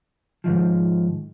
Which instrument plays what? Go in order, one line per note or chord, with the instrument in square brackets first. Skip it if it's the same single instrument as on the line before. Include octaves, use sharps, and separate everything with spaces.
[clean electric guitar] G#2 D#3 F3